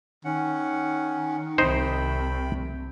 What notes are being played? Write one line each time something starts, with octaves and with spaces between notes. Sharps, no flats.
D#3 C#4 F#5
C2 C3 D#4 C5 G5 B5